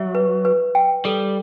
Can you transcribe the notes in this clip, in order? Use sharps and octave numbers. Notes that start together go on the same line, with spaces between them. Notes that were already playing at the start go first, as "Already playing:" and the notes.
Already playing: F#3 E5
B4
B4
G5
G3 A4